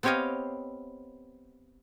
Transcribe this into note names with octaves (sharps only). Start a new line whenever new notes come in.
B3 C4 G4 C#5 D#5 F5